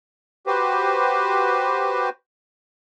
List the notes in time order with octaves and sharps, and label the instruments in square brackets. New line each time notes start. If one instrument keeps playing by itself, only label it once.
[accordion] F#4 G4 B4 C5